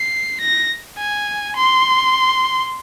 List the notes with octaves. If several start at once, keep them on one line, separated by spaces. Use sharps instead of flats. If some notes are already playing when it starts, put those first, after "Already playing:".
Already playing: C7
A#6
G#5
C6